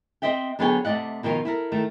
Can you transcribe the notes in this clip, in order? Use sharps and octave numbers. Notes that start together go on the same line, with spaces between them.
C4 C5 D#5 E5 G5
D3 F#3 B3 G#4 C#5 G5
C3 A3 D5 D#5 F#5
B2 D#3 F3 C4 D#4 F4
E4 A4 A#4
D#3 A3